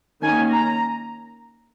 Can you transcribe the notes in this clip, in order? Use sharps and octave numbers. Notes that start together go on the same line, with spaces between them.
D#3 A#3 C#4 G#5
A#5